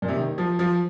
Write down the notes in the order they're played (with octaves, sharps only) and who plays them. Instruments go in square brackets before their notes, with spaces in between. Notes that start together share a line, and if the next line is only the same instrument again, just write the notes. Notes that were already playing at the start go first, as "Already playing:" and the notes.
[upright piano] A#2
C3
D#3
F3
F3